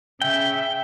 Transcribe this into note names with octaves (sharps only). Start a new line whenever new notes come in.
C#3 E5 G5